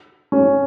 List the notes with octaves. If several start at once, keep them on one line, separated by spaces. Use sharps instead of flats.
C#4